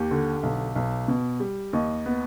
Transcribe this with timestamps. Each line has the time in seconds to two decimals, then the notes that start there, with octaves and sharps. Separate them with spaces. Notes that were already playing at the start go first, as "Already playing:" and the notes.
Already playing: D#2 G4
0.11 D3
0.43 B1
0.76 B1
1.08 B2
1.40 G3
1.73 D#2 D#5
2.06 B3